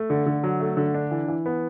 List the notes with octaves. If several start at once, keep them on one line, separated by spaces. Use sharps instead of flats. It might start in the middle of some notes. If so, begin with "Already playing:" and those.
Already playing: A3
D3
D3
F#3
A3
D3
D4
E3
E3
B3